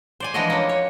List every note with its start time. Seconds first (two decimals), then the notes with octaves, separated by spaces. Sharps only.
0.20 C5 D5 G#5
0.34 E3 F3 G#3 D4 F#4 D#5
0.50 A#3 C#4
0.69 C#5